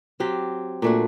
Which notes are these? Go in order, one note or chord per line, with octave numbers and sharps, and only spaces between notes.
F#3 C4 G4
A#2 A3 D4 F#4